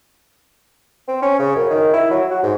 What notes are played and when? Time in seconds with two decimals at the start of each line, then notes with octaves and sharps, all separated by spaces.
1.08 C4
1.22 C#4
1.39 C#3
1.56 F#2
1.70 D#3
1.94 E4
2.11 F#3
2.31 F#4
2.43 G#2